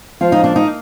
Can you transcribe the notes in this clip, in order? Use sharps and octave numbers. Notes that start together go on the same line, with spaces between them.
F3 F4
D#4
A#3 D4
D#4